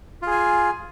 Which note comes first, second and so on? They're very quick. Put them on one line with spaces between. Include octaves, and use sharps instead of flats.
F4 G#4 G#5